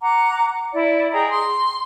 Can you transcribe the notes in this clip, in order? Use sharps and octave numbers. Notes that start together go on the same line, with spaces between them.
F#5 A#5 D6
E4 D5
G#4 D#5 G5 A#5
C6